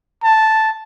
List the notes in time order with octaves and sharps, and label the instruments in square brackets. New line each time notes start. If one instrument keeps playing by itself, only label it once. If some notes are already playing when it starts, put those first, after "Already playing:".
[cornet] A5